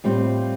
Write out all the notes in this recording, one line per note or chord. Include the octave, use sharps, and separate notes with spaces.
A2 G3 C4 F4